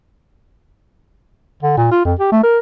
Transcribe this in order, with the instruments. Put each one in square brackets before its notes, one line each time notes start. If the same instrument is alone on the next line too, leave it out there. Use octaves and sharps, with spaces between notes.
[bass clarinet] D3
A#2
F4
F2
G4
A3
A#4